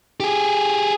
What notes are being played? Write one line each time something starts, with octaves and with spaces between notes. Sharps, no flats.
G4 G#4